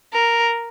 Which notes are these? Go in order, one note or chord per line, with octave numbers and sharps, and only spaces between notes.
A#4